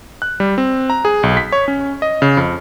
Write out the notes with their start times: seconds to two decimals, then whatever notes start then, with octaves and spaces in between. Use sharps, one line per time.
0.22 F#6
0.40 G3
0.58 C4
0.90 A#5
1.05 G#4
1.23 B1
1.37 B6
1.52 C#5
1.68 C#4
2.02 D#5
2.22 C#3
2.37 F2